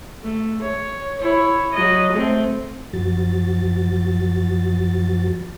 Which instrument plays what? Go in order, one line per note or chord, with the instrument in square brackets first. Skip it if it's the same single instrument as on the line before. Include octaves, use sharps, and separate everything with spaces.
[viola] A3
C#5
E4 C#5
F#3 D#5
A3 C4
[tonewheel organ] F#2 F3 F#4 A6